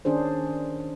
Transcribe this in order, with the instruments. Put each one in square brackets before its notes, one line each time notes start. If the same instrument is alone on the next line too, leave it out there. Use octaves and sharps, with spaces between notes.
[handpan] D#3 C#4 D4 G#4 C5